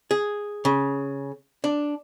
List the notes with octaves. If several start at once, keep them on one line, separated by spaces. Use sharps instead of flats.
G#4
C#3
D4